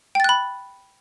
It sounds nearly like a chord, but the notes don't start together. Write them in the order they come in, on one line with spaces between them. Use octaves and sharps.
G5 A6 F#6 B5